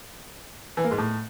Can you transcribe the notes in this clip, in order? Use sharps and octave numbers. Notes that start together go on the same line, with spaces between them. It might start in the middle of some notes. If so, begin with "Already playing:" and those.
E3
A#3
G#2
A2